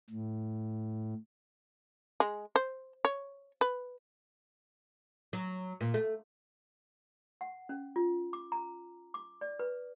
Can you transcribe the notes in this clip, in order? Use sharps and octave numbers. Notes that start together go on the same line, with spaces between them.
A2
G#3
C5
C#5
B4
F#3
A#2
A3
F#5
C#4
F4
D6
A#5
D6
D5
B4